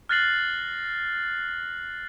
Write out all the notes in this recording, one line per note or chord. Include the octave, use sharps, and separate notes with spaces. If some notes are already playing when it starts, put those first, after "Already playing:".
F6 F#6 A6 A#6 C7 F#7